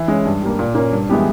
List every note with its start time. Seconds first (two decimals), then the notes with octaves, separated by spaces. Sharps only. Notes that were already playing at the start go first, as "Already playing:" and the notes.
Already playing: E3
0.08 G#3 C#4
0.25 G2
0.42 G3 A#3
0.59 A#2
0.75 A#3 C#4
0.92 G2
1.09 E3 G#3 B3 G4